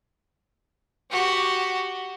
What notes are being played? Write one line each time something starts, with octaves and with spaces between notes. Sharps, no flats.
F#4 G4